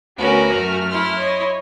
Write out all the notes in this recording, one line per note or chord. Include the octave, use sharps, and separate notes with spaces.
D2 B3 C#4 F#4 A#4
F#2 A3 F6
E4 C6
C#5 D#5